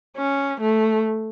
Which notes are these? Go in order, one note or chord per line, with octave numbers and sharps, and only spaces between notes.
C#4
A3